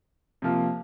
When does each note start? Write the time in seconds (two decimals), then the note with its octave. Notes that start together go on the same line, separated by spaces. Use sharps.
0.42 C3 F3 A#3